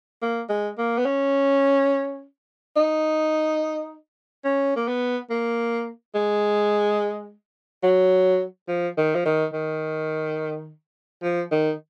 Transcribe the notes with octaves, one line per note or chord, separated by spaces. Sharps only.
A#3
G#3
A#3
B3
C#4
D#4
C#4
A#3
B3
A#3
G#3
F#3
F3
D#3
F3
D#3
D#3
F3
D#3